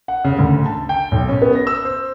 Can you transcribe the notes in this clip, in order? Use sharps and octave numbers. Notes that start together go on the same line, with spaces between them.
F#5
C#3
D2
A5
G5
B1
C#4
B3
A#6
E6
C5